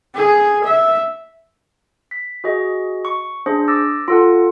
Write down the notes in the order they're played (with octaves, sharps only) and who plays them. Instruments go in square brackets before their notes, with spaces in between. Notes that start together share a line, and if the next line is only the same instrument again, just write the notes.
[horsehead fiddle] G#4
E5
[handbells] B6
F#4 G#4 D#5
C#6
D4 G#4 C5
D6 E6 A6 A#6
F4 A4 F#5